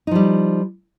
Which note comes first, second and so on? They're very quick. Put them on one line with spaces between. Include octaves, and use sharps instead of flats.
D#4 F3 G3